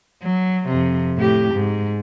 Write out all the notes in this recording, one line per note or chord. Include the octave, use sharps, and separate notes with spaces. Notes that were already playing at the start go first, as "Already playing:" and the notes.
F#3
F2 C3
A2 G4
G#2